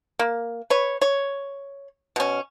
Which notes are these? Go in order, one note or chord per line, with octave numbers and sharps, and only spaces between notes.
A#3
B4 C#5
C#5
B2 C#4